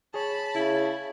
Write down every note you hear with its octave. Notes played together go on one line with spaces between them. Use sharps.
G#4 C#5 A5 B5
C#3 E4